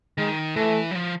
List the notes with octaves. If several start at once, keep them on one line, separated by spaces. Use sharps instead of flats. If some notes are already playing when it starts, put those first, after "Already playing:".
D#3 G#3
E3 A3
F#3
F3